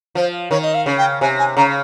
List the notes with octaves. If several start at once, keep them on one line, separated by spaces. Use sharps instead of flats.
F3 C5
D#3 C#5
D#5
F5
C#3
G5
C3 G#5
G#5
C#3 A#5